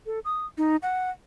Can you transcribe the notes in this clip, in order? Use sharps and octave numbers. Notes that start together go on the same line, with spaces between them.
A4
D#6
D#4
F#5